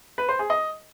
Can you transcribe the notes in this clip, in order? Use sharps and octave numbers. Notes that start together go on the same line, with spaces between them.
B4
C5
G#4
D#5